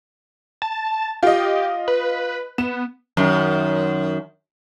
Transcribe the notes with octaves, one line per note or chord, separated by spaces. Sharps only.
A5
F4 G4 D#5
B4
B3 E7
F#2 D#3